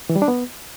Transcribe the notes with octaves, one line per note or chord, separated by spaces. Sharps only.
E3
G3
D4
B3